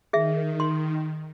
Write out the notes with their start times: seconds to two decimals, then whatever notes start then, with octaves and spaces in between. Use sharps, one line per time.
0.13 D#3 G#4 E5
0.60 C6